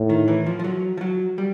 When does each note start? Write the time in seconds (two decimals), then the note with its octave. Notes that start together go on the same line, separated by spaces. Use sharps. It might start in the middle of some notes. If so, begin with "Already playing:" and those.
Already playing: A2
0.10 D#3
0.28 E3
0.46 F3
0.59 F3
0.64 F#3
0.97 F3
1.01 F#3
1.38 G3